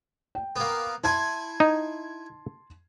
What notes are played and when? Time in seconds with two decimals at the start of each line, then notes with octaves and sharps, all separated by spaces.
0.35 G5
0.56 A#3 B3
1.04 E4 G#5 A5 C6 G#6
1.60 D#4